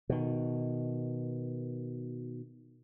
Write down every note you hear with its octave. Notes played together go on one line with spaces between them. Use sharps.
B2 D#3